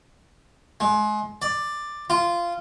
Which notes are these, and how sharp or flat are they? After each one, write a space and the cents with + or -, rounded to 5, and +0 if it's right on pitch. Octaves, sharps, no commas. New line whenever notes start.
G#3 +30
D5 +10
F4 -15